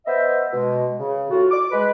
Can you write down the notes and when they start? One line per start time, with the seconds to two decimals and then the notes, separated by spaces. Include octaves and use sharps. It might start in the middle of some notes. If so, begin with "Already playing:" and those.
0.06 B3 B4 C5 D#5 E5
0.53 B2 G#3
0.99 C#3
1.29 A2 F4 F#4
1.51 D6
1.71 G#3 B4